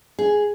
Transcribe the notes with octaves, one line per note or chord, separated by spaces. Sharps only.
G#4